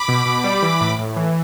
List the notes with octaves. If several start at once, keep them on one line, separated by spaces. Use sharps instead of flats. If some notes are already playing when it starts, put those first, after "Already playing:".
Already playing: B5 D6
B2
B2
G3
E3
A2
A2
E3